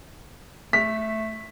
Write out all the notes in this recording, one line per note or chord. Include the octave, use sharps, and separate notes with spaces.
A3 B6